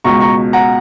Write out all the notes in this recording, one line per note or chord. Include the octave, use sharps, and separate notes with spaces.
C#2 B2 A#5 C#6
A#5 C#6
F#5 A#5